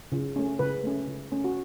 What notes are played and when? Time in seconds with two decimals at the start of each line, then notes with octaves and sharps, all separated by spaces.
0.12 C#3
0.36 A3 C#4
0.59 C#3 B4
0.84 A3 C#4
1.08 C#3
1.32 A3 C#4
1.44 F#4